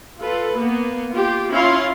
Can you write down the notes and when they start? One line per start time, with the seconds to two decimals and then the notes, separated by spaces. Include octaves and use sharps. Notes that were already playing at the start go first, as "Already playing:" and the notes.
0.20 F4 A4 B4
0.57 A#3 B3
1.12 F4 G4
1.53 C#4 E4 F4 F5 C6